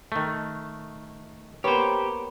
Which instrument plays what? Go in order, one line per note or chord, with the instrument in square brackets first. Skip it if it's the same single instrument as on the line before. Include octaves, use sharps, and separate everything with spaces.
[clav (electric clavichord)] D#3 A3
[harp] A#3 B3 C#5 [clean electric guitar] G4 C5